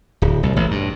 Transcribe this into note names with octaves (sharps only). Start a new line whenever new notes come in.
D1
C2
A1
G2